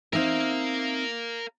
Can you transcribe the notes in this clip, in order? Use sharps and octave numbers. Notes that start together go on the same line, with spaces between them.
C4 D#4 A#4 E5 F5